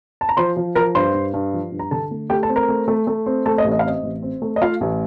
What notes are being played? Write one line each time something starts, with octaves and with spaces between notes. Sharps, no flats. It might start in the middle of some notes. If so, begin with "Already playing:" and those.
A5
A#5
F3 C5 C6
F3
F3 A#4 A#5
G2 C5 C6
G2
G2
F3
G2
A#5
D3 A4 A5
A3
A3 G4 G5
A4 A5
C4
A#4 A#5
A3
A3
A3
C4
A3 A4 A5
D#5
A1
D#5
F5
C4 D#5
A1
C4
A3
D#5
A3 F4 F5
A1